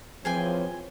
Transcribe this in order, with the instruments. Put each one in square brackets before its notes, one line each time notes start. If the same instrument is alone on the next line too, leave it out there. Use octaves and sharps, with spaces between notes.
[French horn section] E3 C4 C#5 [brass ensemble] F3 [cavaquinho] G#4 G5 G#5